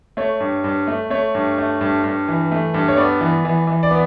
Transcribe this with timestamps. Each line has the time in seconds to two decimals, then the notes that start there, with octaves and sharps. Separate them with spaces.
0.17 A3 C#5
0.40 G2
0.64 G2
0.87 A3
1.10 A3 C#5
1.35 G2
1.58 A3
1.81 G2
2.04 G2
2.28 E3
2.52 A3
2.74 G2
2.88 C#5
2.97 B3 D5
3.21 E3
3.45 E3
3.67 E3
3.83 D5
3.91 B3